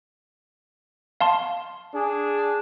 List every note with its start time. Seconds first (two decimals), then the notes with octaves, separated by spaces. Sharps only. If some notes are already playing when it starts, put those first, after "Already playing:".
1.21 F5 A5 C6
1.95 D4 G#4